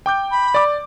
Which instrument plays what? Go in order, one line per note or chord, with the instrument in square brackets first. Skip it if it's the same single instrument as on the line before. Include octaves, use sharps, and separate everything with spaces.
[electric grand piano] G5 D6 G6
[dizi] B5
[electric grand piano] D5 D6